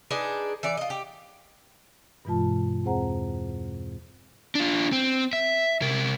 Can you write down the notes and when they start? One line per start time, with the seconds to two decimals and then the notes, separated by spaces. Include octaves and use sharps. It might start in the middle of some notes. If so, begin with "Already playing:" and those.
0.11 D4 D#4 G#4 B4
0.63 E3 D5
0.77 F4 D#5
0.90 G4
2.25 G2 B2 E3 G#3 F4 A5
2.84 E2 C4 G#4 C5 F#5 A#5
4.55 D4 F4
4.92 C4
5.33 E5
5.82 C3 A#4